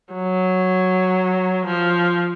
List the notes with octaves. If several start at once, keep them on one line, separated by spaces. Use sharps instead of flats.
F#3
F3